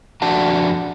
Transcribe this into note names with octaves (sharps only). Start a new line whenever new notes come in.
F2 D4 F#4 A5